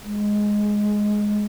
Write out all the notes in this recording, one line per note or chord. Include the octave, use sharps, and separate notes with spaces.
G#3